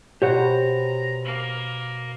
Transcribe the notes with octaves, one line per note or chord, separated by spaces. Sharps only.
B2 G4 C5 C#5 F#5 A#5
A#3